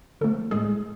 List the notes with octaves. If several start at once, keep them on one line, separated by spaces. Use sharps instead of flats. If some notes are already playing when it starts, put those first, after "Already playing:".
D3 F3 A3 A4
A2 G#3 G#4